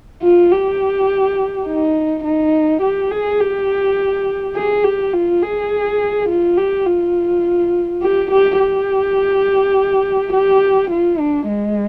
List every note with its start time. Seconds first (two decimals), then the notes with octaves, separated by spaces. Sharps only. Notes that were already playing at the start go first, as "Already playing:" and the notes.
0.22 F4
0.52 G4
1.67 D#4
2.25 D#4
2.82 G4
3.11 G#4
3.40 G4
4.56 G#4
4.84 G4
5.14 F4
5.42 G#4
6.29 F4
6.57 G4
6.87 F4
8.03 G4
8.31 G4
8.59 G4
10.33 G4
10.90 F4
11.20 D4
11.48 G#3